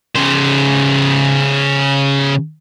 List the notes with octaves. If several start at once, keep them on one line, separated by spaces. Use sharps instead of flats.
C#3 C5